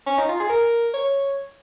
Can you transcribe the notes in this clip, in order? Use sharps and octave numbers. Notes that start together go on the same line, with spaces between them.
C#4
D#4
F4
G#4
A#4
C#5